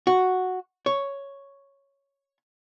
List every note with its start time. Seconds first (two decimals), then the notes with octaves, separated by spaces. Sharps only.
0.07 F#4
0.86 C#5